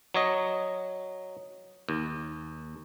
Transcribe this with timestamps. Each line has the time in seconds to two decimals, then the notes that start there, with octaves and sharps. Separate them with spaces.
0.14 F#3 C#5 D#5
1.89 D#2